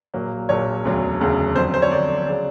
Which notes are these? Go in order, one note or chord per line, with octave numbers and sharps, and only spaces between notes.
A#1 A#2 F#3 A#3
A#1 A#2 F#3 A#3 C#5
E1 D2 C#3 F#3
E1 D2 C#3 F#3
F2 D3 F#3 C5
C5
C#5
F2 D3 F#3 D5
C#3 F#3